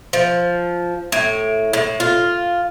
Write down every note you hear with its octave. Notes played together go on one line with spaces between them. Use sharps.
F3
A2
A2
F4